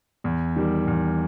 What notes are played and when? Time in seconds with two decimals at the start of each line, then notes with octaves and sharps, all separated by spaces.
0.24 E2
0.56 D#3 G3
0.87 E2